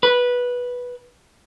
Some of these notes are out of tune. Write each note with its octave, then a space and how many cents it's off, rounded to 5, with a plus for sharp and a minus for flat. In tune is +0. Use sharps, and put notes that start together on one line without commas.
B4 -10